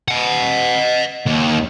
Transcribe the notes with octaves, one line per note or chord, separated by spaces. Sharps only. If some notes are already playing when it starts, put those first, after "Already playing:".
D#5 F#5
D#2